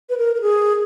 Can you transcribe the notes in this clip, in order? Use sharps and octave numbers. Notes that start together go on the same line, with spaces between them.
B4
A#4
A#4
G#4